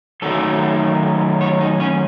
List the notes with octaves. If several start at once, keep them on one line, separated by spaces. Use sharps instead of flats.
F#2 D#3 F#3 A3 A4
C#5
D#4
C#4